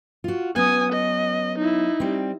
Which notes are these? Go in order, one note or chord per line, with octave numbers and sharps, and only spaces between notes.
F4 F#4
F#3 B3 C#4 G#5 D#6
D#5
D#4 E4
G3 C4